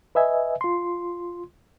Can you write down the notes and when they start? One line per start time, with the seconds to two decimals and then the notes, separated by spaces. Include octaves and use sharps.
0.15 B4 D#5 E5 G#5
0.61 F4 C6